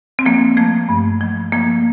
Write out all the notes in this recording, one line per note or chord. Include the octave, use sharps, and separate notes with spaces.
C4
F3 A#3
F3 A3
G2
F3
F3 A#3